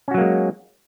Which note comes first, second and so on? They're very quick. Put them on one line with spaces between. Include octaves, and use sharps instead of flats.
C#4 F#4 F#3 A#3 G#3